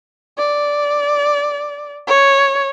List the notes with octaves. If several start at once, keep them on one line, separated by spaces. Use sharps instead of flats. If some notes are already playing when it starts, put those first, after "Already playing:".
D5
C#5